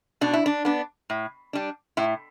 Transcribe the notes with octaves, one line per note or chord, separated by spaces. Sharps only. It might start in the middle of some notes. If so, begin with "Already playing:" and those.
B2 D4
E4
D4
B3 D4
A2
G3 D4
A2 E4